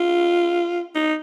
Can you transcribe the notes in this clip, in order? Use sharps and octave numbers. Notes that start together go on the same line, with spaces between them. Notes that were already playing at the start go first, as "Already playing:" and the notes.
Already playing: F4
D#4